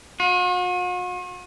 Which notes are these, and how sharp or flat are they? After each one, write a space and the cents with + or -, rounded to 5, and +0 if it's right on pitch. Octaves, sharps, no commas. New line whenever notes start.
F#4 -45